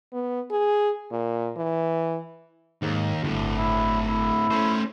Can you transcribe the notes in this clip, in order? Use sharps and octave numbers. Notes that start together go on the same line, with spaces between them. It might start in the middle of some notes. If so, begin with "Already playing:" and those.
B3
G#4
A#2
E3
D#2 G#2
G1 D2 A2
E4
E4
A3 C#4 C5